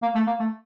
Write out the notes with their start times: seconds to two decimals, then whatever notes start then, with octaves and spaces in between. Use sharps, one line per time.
0.02 A#3
0.15 A3
0.27 A#3
0.40 A3